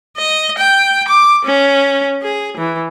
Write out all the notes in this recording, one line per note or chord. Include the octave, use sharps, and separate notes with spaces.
D#5
G5
D6
C#4
G#4
E3